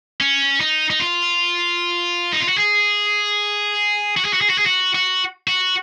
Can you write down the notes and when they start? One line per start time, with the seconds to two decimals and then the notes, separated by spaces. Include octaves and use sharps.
0.21 C#4
0.61 D#4
0.90 D#4
1.00 F4
2.33 D#4
2.40 F4
2.49 F#4
2.58 G#4
4.17 F#4
4.25 G#4
4.33 F#4
4.41 G#4
4.50 F#4
4.58 G#4
4.66 F#4
4.95 F#4
5.48 F#4